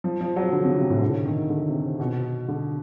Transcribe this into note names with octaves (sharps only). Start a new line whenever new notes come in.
F3
F3
F#3
D3
C#3
C3
A2
D3
D#3
D3
C3
C3
B2
D3